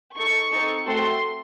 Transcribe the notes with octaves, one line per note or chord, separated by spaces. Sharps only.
D#4 A4 C#6
C4 D#4 A4
A3 C4 F#4 A4 C6